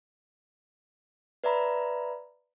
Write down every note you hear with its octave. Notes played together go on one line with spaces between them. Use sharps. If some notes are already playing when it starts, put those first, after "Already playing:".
B4 D5 E5 A#5 B5